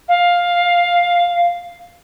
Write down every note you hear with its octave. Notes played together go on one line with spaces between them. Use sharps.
F5